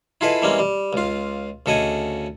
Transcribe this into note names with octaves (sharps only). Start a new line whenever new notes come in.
E4 F4 G#4 A4 B4 D#5
E3 G3 G#3 A#3 C4 C#4
G3
C#2 F4
D2 C#3 A4 D#5 F#5 G#5